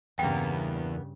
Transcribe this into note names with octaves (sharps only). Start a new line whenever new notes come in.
E2 G2 C#3 A#3 B3 G5